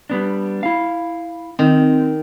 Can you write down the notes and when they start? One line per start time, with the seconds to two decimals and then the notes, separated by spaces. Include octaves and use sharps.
0.10 G3 B3 D4
0.63 E4 F5
1.59 D#3 C4